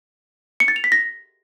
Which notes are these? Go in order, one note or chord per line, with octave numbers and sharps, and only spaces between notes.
C#7
A6
F7
B6
A#6